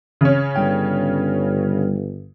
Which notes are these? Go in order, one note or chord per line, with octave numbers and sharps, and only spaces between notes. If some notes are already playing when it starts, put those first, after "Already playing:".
C#3 C#4
G1 G3 G5